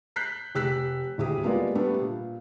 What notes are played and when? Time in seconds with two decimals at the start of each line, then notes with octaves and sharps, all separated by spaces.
0.16 F#6 G6 B6 C7
0.55 F1 G4 E6 F#6 B6
1.18 D#1 D2 E4 G4 G#4 D#6
1.42 G3 G#3 A#3 B3 F4 D5
1.75 G3 A3 B3 D4
2.01 A#2